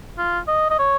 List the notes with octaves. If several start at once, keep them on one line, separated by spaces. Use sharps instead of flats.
F4
D#5
D#5
C#5